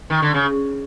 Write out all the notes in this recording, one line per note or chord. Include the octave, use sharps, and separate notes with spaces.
D#3
D3
C#3